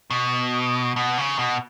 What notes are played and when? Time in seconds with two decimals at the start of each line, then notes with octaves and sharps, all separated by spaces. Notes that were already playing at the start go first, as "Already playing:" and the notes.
0.10 B2
0.96 B2
1.18 C#3
1.39 B2